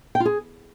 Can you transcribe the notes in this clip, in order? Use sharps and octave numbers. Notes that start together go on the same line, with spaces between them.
G5
F4
G#4